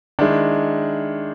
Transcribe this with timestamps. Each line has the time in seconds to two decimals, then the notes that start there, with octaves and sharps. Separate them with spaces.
0.19 D#3 G#3 D4 E4